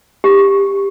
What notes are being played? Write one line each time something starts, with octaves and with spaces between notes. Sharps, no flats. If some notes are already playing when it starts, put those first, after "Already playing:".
G4